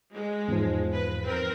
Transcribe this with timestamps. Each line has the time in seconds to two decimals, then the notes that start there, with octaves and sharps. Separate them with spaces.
0.12 G#3
0.48 E2 G#2 F3
0.92 B4
1.24 C4 A#4